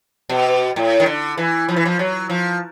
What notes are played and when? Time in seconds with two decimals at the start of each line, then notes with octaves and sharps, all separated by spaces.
0.29 B2
0.76 A2
1.00 D#3
1.06 D3
1.38 E3
1.68 F3
1.76 E3
1.85 F3
1.99 F#3
2.29 F3